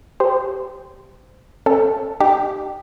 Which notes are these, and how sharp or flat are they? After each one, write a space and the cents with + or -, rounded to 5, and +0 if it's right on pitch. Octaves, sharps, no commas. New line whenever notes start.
G4 +0 C5 -25
C#4 -35 A4 +0
D#4 -45 G4 -10